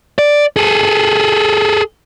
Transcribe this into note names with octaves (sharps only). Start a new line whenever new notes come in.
D5
G#4 A4